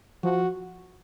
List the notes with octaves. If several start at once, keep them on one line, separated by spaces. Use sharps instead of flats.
F3 F#4